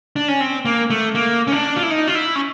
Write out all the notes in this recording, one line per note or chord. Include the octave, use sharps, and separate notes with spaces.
D4
C#4
C4
A#3
A3
A#3
C#4
D4
F4
E4
D#4
F4
E4
C#4